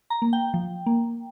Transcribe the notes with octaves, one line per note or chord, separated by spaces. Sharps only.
A#5
A#3
G5
F3
A#3